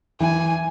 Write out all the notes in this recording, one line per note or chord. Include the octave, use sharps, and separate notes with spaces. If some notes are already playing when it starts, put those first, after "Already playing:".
E3 G#5